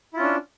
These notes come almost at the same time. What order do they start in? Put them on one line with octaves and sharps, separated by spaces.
E4 F4 C#4 D4